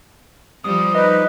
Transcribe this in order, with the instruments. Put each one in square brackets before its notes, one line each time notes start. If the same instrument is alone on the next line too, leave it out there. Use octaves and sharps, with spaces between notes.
[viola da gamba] F3 G3 [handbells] D#6
[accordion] D#4 B4 [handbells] D#5